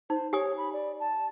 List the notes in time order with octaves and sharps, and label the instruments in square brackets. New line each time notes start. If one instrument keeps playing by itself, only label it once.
[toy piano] D#4 [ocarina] C5
[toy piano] G4 G#5 D#6 [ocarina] C#5
[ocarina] B5
D5
A5